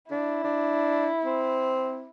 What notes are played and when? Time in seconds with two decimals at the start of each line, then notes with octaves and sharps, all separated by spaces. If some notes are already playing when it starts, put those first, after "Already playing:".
0.11 D4 E4
0.44 D4
1.25 C4